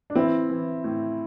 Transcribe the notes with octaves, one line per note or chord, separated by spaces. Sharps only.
D4
E3 C4 E4
E3
A2